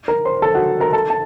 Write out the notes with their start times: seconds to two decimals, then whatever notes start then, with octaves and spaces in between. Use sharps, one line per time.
0.08 A#4 A#5
0.25 C5 C6
0.42 A4 A5
0.55 F#4 F#5
0.80 A#4 A#5
0.93 A4 A5
1.10 A5